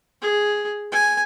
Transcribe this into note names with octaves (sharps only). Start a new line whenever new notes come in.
G#4
G#5